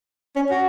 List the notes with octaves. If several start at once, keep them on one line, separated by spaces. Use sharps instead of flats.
C#4
F#4